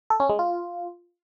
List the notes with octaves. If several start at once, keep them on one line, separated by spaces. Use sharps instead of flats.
A4
C#4
G#3
F4